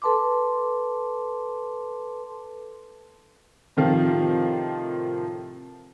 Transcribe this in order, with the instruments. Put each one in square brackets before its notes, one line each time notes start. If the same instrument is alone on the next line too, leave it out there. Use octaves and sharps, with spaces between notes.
[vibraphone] A4 B4 A5 C6 D6
[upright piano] A2 C3 D#3 F3 C4 F4